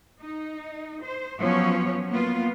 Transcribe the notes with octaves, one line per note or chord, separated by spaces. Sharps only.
D#4
C5
F3 F#3 B3 C#4 C#5
A#3 B3 F4